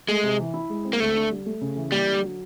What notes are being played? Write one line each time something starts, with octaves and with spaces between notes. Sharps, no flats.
G#3 A3
C3
E3
E4
G#3
C4
A#3
D2 A3
D3
G3
A3
C#3
E3
G3 A#3
D3
F#3